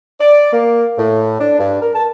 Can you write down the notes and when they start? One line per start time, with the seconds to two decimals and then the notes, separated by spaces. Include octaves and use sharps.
0.20 D5
0.53 A#3
0.98 A2
1.40 D4
1.59 G2
1.82 A#4
1.94 A5